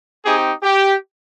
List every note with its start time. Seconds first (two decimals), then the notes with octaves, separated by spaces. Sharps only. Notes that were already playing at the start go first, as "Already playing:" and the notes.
0.25 C4 D#4 G4 G#4
0.63 G4